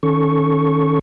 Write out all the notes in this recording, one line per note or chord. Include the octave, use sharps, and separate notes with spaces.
D#3 C#4 A4 C#6